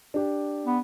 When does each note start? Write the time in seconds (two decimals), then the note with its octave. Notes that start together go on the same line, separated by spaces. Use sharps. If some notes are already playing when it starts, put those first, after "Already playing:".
0.14 D4 G4
0.65 B3